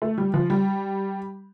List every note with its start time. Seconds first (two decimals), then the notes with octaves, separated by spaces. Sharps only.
0.02 A3
0.18 G3
0.34 F3
0.50 G3